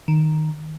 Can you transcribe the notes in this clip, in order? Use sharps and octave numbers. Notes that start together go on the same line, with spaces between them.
D#3